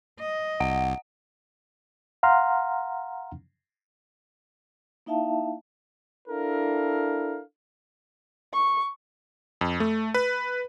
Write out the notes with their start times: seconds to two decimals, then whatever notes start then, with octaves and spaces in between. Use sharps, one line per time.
0.19 D#5
0.60 C2 F#5
2.23 F5 F#5 A#5 C6 F6
5.06 A#3 D#4 E4 E5 F5 A5
6.29 D4 E4 A4 A#4 F5
8.53 C#6
9.61 F2
9.80 A3
10.14 B4